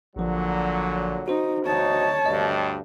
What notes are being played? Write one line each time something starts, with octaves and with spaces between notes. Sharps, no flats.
A1 A#2 D3 F3 F#3
D#4 F#4 C5
D2 D#4 C#5 A5
D2 G2 D#5